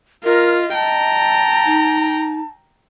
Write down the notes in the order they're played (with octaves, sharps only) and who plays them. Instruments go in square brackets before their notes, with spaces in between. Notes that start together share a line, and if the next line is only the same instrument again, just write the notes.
[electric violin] F4 [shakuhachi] A#4 [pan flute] D#5
[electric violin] G5 A#5 [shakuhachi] A5
[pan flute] D#4